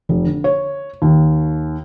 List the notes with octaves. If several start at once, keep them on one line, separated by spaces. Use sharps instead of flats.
F1
D3
C#5
D#2